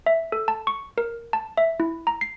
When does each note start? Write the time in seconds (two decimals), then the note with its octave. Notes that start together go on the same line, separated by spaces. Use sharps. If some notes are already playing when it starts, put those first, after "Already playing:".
0.06 E5
0.32 A4
0.48 A5
0.67 C#6
0.98 A#4
1.33 A5
1.57 E5
1.80 E4
2.07 A#5
2.21 C7